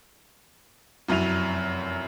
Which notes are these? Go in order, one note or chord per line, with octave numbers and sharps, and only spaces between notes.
F1 F#2 F#3 E4 D#7 F7